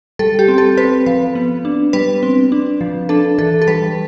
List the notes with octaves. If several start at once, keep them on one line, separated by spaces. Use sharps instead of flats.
G3 A4
G4
C4
A4
C4 B4
F3 B4
B3
D4
G3 B4
C4
D4
F3
D4 A4
E3 A4
A4
G3 B4